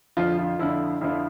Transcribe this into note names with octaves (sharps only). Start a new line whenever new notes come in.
F2 D3 F3 F4
F4
F2 D3 F3 E4
F2 D3 F3 E4